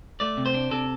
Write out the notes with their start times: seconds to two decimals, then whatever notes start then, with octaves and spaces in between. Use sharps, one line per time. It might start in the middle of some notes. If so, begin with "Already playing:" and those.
0.20 A3 D5
0.37 C3
0.46 C5
0.54 D4
0.71 C3 A4